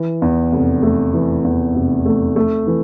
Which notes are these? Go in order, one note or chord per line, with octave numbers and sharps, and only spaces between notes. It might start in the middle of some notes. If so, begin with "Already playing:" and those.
Already playing: E3
E2
F1
A3
E3
E2
F1
A3
A3
E3